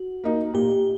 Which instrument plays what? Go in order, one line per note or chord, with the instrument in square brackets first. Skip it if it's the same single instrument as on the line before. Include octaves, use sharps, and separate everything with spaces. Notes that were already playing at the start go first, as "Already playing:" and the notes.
Already playing: [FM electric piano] F#4
[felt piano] A#3 D#4
[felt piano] A#2 [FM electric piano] G4